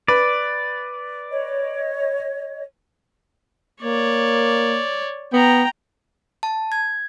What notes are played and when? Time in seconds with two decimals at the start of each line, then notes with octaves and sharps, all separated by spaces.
0.08 B4 D5
1.30 C#5 D#5
3.83 A#3 C#5 D5
5.33 B3 G5 A#5
6.43 A5
6.72 G#6